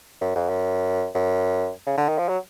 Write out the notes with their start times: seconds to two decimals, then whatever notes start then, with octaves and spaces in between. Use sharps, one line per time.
0.21 F#2
0.35 F2
0.49 F#2
1.15 F#2
1.87 C#3
1.98 D3
2.09 D#3
2.18 F3
2.29 F#3